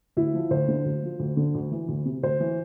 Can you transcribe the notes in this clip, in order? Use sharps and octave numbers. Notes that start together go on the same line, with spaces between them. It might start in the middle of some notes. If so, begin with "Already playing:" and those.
D2 E4
F3
D2 C5
D3
D2
F3
D2
D3
D2
E3
D2
C3
D2 C5
E3